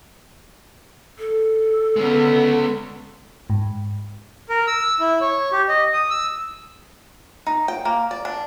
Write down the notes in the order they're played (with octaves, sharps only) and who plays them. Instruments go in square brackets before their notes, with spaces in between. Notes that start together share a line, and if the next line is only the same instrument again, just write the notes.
[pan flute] A4
[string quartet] D3 B3 [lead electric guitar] G#3 C#4
[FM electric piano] G#2
[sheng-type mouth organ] A#4
E6
E4
C#5
G4
D#5
D#6
E6
[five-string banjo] D#4
G5
A#3
D5
D4